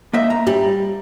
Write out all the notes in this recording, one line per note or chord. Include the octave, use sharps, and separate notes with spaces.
A#3 D#5 E5
A#5
G3